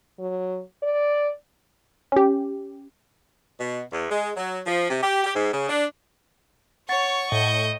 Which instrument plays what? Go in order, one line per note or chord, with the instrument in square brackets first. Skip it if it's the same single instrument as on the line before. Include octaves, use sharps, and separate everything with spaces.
[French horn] F#3
D5
[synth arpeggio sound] C#4 G4
[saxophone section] B2
E2
G#3
F#3
F3
C3
G4
G4
G#2
C#3
D4
[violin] C#5 [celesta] F#5 A6 [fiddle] C#6
[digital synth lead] A2 [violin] D#5 G6